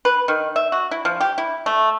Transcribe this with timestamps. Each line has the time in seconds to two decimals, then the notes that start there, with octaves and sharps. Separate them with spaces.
0.05 B4
0.28 D#3
0.56 E5
0.72 F#4
0.91 E4
1.05 F3
1.20 G4
1.38 E4
1.66 A3